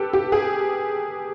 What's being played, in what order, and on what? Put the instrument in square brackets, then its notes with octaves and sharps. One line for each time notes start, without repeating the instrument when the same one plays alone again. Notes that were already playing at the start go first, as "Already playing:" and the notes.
Already playing: [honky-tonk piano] G4 A4 B4
G4
G#4